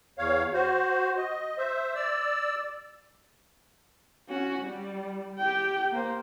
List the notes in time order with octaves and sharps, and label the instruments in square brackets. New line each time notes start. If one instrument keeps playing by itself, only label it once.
[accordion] E2 C#5 F5
F#4 C5
D#5
C5 E5
D5 E6
[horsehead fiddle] C#4 F#4
G3
G4 G5
A#3 C5